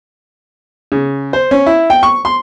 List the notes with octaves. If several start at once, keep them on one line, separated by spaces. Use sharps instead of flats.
C#3
C5
C#4
E4
G5
C#6
C6